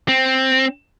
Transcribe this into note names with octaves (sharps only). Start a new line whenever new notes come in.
C4